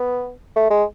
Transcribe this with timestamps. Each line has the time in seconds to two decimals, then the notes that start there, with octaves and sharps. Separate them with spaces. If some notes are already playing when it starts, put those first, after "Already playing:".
Already playing: B3
0.56 A3
0.70 G#3